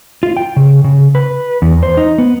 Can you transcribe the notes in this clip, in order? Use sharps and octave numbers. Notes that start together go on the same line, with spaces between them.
F4
G5
C#3
C#3
B4
E2
C5
D#4
B3